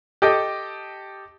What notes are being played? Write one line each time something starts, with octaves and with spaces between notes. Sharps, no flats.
G4 A4 D#5 D6 G6